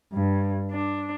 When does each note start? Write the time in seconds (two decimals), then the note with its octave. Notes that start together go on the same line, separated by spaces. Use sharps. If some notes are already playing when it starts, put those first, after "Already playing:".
0.12 G2
0.72 D4